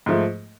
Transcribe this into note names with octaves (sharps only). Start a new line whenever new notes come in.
G#2 F3 A3